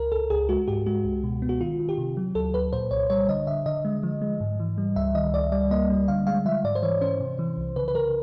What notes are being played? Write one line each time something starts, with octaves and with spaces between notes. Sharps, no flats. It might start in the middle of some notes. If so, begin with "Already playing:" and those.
Already playing: C#2 A#4
C#2 A4
C#2 G#4
G#3 F#4
G#2 G4
G#3 F#4
C#2
B2
B3
F#4
D#3 F4
D#3
G4
C3
F#3
D2 A4
D2 B4
A#2 C5
C2 C#5
G3 C#5
D3 D#5
D3 E5
D3 D#5
G#3
F3
G#3
G#2
E3
G3
C#2 E5
D#3 D#5
C#2 D5
G3 D5
A#3 D#5
G3
D3 F5
G#3 F5
F3 E5
G#2 D5
C5
E3 C#5
C#4 C5
C3
E3
C2
C#3 B4
B4
C#3 A#4